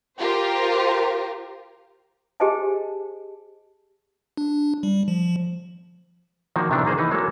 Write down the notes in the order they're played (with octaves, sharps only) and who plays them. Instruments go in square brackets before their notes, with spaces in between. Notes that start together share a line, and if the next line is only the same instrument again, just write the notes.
[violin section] F4 G4 A#4 C5
[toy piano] G4 G#4 C5 D#5 G#5 A5
[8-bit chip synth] D4
G3
F3
[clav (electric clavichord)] D#3 F3 A#3 F#4
C3 D#3 E3 B3 D4
D#3 A#3 G#4 C5
E3 D#4 B4
F#3 G#3 A#3 A4